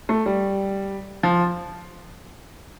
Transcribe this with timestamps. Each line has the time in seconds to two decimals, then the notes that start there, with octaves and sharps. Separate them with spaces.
0.09 A3
0.26 G3
1.23 F3